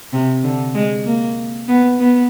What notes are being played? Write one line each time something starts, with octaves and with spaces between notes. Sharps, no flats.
C3
D3
G#3
A#3
B3
B3